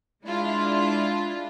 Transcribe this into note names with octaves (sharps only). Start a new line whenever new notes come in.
G#3 D4 E4 F4